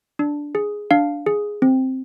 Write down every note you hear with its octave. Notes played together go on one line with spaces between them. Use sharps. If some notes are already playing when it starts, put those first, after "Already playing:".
D4
G#4
D4 F5
G#4
C4